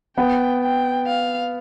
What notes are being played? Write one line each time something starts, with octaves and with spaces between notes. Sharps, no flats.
B3 G5
G5
F5